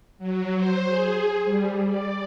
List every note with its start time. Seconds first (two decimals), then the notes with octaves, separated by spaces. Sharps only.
0.19 F#3
0.56 C5
0.89 G#4
1.45 G3
1.86 D5